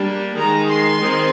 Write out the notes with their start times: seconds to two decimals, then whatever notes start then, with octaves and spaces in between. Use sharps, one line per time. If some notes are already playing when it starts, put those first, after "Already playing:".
Already playing: G3 A#3 D4
0.37 D#3 G#3 D#4 A#5
0.68 C6
0.99 D#3 G#3 C4 D#4